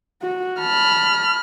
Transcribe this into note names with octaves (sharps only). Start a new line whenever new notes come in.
F#4
A5 B5 F6